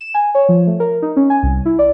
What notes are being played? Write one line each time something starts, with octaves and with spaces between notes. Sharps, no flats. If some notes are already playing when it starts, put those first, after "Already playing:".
E7
G#5
C#5
F3
A3
A#4
D#4
C#4
G#5
C2
E4
D5